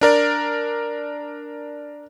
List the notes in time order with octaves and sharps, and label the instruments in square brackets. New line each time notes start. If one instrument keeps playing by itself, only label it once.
[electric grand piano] D4 A#4 D5